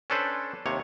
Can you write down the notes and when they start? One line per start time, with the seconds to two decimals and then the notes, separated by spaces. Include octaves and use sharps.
0.10 C#4 D4 A4 B4 C5
0.66 D#2 C3 C#5